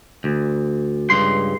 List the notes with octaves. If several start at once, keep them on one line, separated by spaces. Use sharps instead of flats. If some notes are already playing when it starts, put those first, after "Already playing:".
D2
C#2 G2 C6